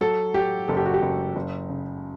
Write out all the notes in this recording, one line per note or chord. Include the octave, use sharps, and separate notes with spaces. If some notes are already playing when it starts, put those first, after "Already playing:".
F#3 A4
F#3 G4
F#1 A4
G4
F#4
G4
F#1
F#1
C#3